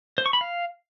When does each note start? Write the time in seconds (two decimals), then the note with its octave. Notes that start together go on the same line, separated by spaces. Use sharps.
0.18 C5
0.26 C#6
0.33 B5
0.41 F5